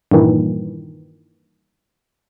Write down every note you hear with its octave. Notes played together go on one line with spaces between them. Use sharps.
G2 A#2 D#3 E3